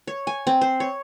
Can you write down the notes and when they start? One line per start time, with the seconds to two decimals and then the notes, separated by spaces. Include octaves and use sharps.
0.07 C#5
0.27 G#5
0.47 C4
0.61 C5
0.80 C#5